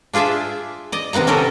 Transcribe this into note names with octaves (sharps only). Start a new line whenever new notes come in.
D4 F4 G#4 D5 E5
D5 D#5
C3 D#3 B3 F#5 A#5
C3 C#4 D#4 G4 A4 A#4